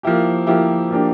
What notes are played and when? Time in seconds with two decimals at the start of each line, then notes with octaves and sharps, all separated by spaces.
0.03 F3 A#3 E4 G4
0.47 F3 A#3 E4 G4
0.90 F3 A#3 D4 G4